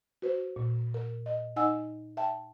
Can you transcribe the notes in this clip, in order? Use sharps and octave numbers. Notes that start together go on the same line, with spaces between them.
F#4 B4 C5
A#2
A#4
D#5
D#4 D#5 F#5 G#5 E6
E5 G5 A5